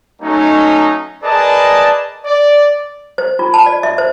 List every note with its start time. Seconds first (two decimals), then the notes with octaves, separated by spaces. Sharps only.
0.22 F#3 A3 C#4 D#4
1.24 G#4 A#4 B4 D5 D#5 A5
2.25 D5
3.18 C5
3.39 F4
3.54 A5
3.66 D5
3.83 E5
3.98 C5